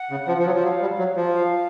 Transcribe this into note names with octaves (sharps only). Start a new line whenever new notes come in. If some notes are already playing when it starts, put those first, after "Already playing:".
Already playing: F#5
C#3
F3
F3
F#3
F3
F#3 F5
G3
F#3
F3
F5